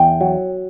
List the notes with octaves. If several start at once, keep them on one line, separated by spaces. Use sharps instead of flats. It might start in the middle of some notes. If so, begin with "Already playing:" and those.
Already playing: E2 G5
F#3